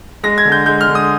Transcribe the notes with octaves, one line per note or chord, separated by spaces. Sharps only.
G#3 A#6
G#6
D3
G6
G#3 G6
F6
D3
D#6